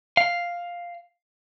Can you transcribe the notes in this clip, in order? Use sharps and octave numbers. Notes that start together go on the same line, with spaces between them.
F5